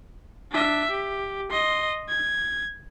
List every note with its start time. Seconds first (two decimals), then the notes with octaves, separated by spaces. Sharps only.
0.51 D4 E5
0.91 G4
1.51 D#5 C6
2.09 G#6